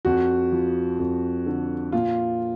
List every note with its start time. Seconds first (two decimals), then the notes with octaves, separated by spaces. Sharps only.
0.05 F2 F#4
0.52 F3
0.99 F2
1.46 D3
1.92 A#2 F4